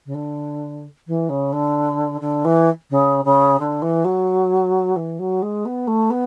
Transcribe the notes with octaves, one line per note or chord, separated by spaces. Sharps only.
C#3
D3
E3
C#3
D3
D3
E3
C#3
C#3
D3
E3
F#3
E3
F#3
G#3
B3
A3
B3